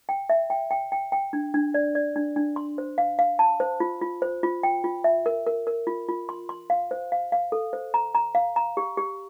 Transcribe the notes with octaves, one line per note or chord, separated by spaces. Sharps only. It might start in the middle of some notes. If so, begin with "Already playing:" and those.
G5
E5
G5
G5
G5
G5
D4
D4
D5
D5
D4
D4
C6
C5
F5
F5
A5
C5
F4
F4
C5
F4
G5
F4
E5
A#4
A#4
A#4
F4
F4
C6
C6
F5
C5
F5
F5
A4
C5
A#5
A#5
F5
A#5
G4
G4